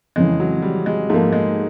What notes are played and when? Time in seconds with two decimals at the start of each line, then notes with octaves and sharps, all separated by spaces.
0.16 F2 C#3 E3 G#3
0.40 F#3
0.62 G3
0.86 G#3
1.10 G#2 F3 A3 A#3
1.33 G#3